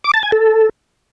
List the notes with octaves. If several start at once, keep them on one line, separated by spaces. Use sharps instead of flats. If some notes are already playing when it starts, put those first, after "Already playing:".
D6
A5
G#5
A4